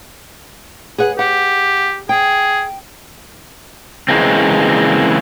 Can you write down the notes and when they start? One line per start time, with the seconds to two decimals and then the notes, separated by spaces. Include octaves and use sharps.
0.98 G#4 B4 F#5
1.19 G4 F#5
2.09 G#4 G5
4.08 C#3 E3 G#3 A#3 C4